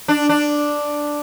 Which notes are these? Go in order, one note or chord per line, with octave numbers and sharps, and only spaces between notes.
D4
D4